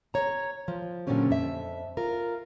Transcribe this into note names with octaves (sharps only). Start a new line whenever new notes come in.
C#5 A#5
F3
A#2 D3 F3 F#3 C#4 G4
F2 E5
F4 A#4